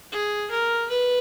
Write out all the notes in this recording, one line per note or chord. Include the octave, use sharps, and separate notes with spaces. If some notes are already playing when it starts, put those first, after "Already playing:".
G#4
A#4
B4